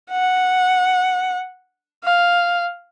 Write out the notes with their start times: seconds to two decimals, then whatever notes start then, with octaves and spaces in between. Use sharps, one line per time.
0.11 F#5
2.04 F5